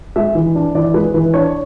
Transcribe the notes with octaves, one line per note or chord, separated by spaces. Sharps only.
G#3 E5
E3
D4
E3 D5
G#3 B4
E3 B4
D4 C#5